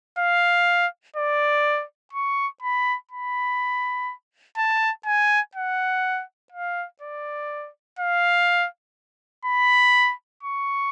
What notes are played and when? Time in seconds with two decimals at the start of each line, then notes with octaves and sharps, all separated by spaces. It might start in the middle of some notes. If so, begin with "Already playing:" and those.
0.18 F5
1.16 D5
2.13 C#6
2.62 B5
3.11 B5
4.57 A5
5.06 G#5
5.55 F#5
6.52 F5
7.01 D5
7.99 F5
9.45 B5
10.43 C#6